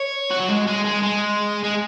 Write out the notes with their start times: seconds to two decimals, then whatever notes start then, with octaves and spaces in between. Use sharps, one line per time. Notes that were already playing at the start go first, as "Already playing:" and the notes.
Already playing: C#5
0.30 F#4
0.39 F#3
0.48 G#3
0.66 G#3
0.84 G#3
1.02 G#3
1.63 G#3